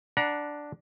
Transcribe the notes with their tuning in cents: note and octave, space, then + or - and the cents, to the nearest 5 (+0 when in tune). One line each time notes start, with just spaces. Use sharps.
D4 +0 F#5 +0 A#5 +35